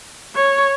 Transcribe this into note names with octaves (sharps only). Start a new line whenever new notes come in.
C#5